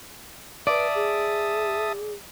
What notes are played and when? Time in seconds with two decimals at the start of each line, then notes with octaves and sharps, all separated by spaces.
0.67 B4 D5 E5 A5 D#6
0.95 G#4